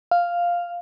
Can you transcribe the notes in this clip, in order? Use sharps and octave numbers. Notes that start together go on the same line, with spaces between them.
F5